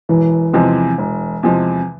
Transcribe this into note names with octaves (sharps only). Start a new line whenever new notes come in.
E1 E3
E2 C3 F3 G#3
E1
E2 C3 F3 G#3